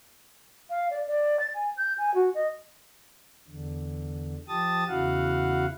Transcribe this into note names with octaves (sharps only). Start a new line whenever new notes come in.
F5
D5
D5
A6
G#5
G6
G#5
F#4
D#5
E2 D3
F3 G4 A5 D#6 A6
E2 C#3 E4 F#4 F5 F#5